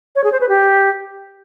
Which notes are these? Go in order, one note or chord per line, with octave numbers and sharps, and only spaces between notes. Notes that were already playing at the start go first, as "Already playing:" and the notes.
C#5
G#4
C5
B4
G4